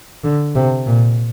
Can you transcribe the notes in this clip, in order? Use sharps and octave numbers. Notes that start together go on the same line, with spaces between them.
D3
C3
A#2